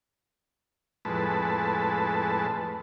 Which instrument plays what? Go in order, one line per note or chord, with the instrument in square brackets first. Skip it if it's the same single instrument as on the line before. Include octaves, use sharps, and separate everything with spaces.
[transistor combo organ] F2 A2 G#3 B4 A5